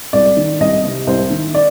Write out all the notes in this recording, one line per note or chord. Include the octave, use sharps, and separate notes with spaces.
C2 D5
D#3
C2 D#5
C3
C2 C5
D#3
D5